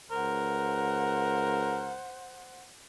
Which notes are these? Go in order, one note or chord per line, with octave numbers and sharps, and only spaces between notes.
C#2 A#4 C5 F#5